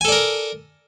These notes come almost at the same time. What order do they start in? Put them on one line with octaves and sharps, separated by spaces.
G#5 A4 D5 A#4